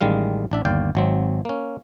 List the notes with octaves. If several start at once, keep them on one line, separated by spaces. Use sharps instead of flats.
A1 D#3 G3 G#3 F5
A1 D4 E5
G1 D#2 D5 F5 G5
G#1 F#3 C4
A#3 C#4